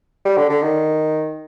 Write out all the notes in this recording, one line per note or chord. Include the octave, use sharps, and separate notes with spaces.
G3
D3
D3
D#3